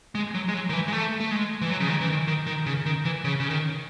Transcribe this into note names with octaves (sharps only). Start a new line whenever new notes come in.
G#3
F#3
G#3
F#3
D#3
E3
G#3
A3
A3
G#3
E3
F#3
C#3
D#3
E3
D#3
D#3
D#3
C#3
D#3
E3
C#3
C#3
D#3